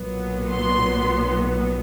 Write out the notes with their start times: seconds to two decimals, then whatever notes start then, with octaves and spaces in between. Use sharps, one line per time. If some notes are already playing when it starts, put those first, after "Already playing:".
Already playing: B1 A#2 F#3 B3
0.50 C6